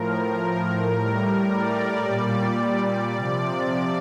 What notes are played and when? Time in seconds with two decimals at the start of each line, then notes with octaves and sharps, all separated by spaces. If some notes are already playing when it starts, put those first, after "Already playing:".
Already playing: A2 F3 A#4
0.91 A2 G3 A#4
1.48 D5
2.03 A#2 G3
3.15 C3 F3 D5